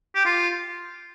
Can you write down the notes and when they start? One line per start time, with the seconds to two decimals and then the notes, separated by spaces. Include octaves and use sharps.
0.15 G4
0.25 F4